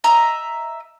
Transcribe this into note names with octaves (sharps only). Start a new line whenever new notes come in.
D#5 E5 A#5